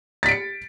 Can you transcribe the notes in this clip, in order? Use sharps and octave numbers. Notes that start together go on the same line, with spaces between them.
A6 B6 C#7 D7